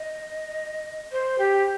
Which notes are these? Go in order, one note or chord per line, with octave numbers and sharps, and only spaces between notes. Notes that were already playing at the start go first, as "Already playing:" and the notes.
Already playing: D#5
C5
G4